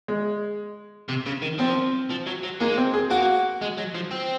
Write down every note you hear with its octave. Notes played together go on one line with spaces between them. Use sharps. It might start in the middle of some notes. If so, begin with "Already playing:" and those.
G#3
C3
C#3
D#3
F3 C4
F3
F#3
F#3
G#3 A#3
C4
G#4
A#3 F#4
G#3
F#3
F3
C4